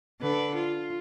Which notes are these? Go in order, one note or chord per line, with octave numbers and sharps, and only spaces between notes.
D3 B4
F4